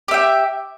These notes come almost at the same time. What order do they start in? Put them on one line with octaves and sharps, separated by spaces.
G4 E5 G5